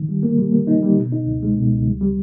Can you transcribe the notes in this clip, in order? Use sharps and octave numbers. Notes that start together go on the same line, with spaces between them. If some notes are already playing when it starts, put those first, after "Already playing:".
Already playing: D#3
G3
A#3
G3
A#3
D#4
G3
B2
D#4
C#2
G#3
B2
C#2
G3
G3